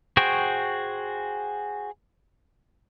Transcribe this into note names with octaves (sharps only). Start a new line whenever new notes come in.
F#4 G#4 C5 G5 C#6